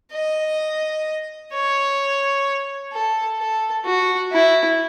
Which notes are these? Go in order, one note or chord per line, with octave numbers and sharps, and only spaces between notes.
D#5
C#5
A4
A4
F#4
E4